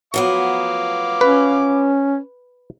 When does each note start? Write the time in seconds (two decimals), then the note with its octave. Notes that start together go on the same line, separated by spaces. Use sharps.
0.14 F3 F#3 B3 F5 D6
1.21 C#4 B4